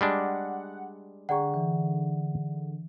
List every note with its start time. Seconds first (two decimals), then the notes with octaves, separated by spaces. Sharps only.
0.01 G3 G#3 D4 F#5
1.29 D3 G#4 D5 F#5 G5 A#5 C#6
1.54 E3